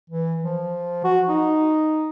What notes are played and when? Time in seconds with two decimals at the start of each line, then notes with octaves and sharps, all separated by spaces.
0.10 E3
0.44 F3
1.04 F#4
1.29 D#4